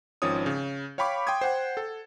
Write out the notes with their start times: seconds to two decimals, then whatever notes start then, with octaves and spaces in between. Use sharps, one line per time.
0.22 G#1 D#3 F3 C#4 C#5 D#6
0.46 C#3
0.98 C#5 F5 G5 B5 C#6 D6
1.27 G5 C6 D6 D#6 G#6
1.41 C5 F#5 G5
1.77 A4